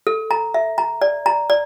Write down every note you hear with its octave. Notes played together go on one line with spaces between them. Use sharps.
A4
A#5
E5
A#5
D5
A#5
D5